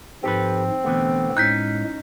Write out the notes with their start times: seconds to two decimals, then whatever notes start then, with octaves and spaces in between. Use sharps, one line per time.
0.24 G#2 F3 C4 G4 A4 B4
0.84 B2 D3 E3 A3 B3
1.37 A2 G#3 C#4 D#4 F#6 G6 B6